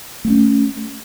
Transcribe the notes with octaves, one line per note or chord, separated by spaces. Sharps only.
A3 A#3 C#4